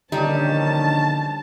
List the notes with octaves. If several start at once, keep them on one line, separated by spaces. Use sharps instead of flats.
A#1 D3 D#3 G3 C#4 D#4 A5